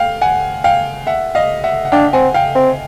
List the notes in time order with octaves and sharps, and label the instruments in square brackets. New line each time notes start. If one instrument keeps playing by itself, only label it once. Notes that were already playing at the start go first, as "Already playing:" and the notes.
Already playing: [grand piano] F5 G5
F#5 G#5
F5 G5
E5 F#5
D#5 F5
E5 F#5
F#5
[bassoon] D4 [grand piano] F5 G5
[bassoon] C4 [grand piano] F#5 G#5
[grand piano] F5 G5
[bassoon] C4